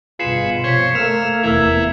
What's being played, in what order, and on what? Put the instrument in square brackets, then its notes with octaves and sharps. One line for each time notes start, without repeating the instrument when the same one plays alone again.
[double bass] G1 B2 [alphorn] F4 [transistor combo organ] G#4 B4 [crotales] C7 C#7 E7
[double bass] C3 F3 [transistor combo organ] C5 C#5 [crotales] G#6 B6
[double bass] A3 [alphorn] A#3 [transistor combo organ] E6 F6 [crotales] E7
[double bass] F1 E2 [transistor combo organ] E3 E4 [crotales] E6 G#6 F7